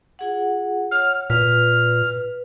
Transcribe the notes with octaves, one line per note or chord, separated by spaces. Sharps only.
F4 G#4 F#5
C#5 F#5 F6
A#2 B4 F6